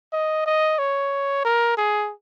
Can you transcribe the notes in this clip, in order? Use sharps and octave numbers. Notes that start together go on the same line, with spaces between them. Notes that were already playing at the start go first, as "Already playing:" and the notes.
D#5
D#5
C#5
A#4
G#4